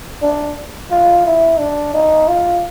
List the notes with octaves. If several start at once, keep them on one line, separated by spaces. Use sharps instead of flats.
D4
F4
E4
D4
D#4
F4